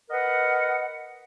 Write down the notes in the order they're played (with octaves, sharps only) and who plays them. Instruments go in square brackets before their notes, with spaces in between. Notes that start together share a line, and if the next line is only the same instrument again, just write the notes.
[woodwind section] A#4 B4 D#5 F#5